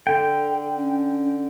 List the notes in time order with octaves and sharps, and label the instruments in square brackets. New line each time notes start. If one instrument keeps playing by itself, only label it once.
[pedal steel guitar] D3 G5 [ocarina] A4
[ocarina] C#4